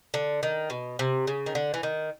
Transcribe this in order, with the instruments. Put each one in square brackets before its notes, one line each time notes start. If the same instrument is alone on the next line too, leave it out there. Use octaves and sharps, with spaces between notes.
[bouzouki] D3
D#3
B2
C3
C#3
D#3
D3
E3
D#3